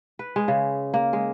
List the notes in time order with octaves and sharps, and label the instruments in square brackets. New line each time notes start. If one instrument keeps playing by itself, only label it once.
[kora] B4
G#3
C#3
A#3
G#3